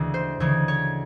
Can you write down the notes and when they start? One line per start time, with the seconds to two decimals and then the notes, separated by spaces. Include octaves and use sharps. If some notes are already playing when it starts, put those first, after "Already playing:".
Already playing: D2 C#3 E3 G#3
0.14 C5
0.40 D2 C#3 E3 G#3 C#5
0.68 C#5